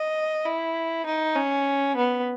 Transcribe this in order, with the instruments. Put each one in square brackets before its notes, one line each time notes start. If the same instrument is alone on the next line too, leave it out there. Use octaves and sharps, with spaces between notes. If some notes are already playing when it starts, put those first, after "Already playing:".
Already playing: [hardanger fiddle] D#5
E4
D#4
C#4
B3